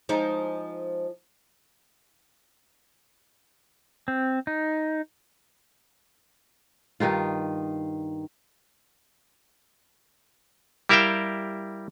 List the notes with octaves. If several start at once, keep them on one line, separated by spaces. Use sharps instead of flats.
F3 G#3 D#4
C4
D#4
G2 D#3 D#4 F4
G3 E4 A#4 E5 F5 G5